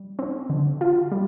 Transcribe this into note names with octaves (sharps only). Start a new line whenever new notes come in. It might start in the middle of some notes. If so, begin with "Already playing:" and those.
Already playing: G3
C4
D3
F4
G3